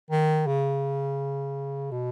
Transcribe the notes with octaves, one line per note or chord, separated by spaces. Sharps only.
D#3
C#3
B2